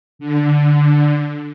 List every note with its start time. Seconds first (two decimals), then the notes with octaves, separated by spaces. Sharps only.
0.19 D3